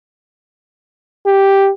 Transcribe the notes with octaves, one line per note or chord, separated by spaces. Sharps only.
G4